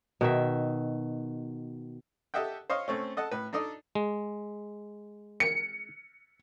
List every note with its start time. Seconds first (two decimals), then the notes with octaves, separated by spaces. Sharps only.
0.21 B2 D#3 E5
2.34 G4 A4 D#5 E5 F#5 G5
2.70 C5 C#5 D#5 F5
2.88 A3 C4 C#4
3.17 A4 D#5 F#5 A5
3.31 A2 B4
3.53 D4 D#4 A4 D5 D#5
3.95 G#3
5.40 C#7